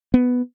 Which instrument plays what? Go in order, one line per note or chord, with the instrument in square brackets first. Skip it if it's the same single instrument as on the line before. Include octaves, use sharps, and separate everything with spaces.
[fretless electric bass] B3